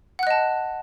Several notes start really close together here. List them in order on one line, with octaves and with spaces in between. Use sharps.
F#5 F#6 D#5 A5